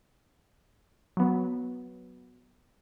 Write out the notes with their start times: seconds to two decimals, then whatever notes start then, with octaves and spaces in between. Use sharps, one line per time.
1.17 F#3 B3